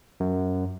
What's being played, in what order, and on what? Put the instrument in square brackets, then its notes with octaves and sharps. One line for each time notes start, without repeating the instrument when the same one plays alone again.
[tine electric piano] F#2